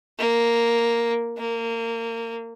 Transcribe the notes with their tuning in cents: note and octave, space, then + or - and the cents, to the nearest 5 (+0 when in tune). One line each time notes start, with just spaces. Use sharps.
A#3 +0
A#3 -25